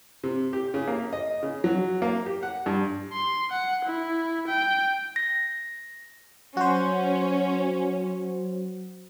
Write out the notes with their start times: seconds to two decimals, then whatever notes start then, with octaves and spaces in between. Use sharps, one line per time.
0.24 C3
0.53 G4
0.74 C#3
0.88 A#3
1.13 D#5
1.43 C#3
1.64 F#3
2.02 A#3
2.26 G4
2.43 F#5
2.66 G2
3.12 C6
3.51 F#5
3.85 E4
4.47 G5
5.16 A#6
6.57 F#3 C#4 F#4 C5